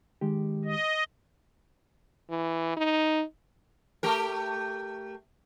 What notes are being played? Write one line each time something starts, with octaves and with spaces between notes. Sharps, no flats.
D#3 G#3 G4
D#5
E3
D#4
A3 G4 A#4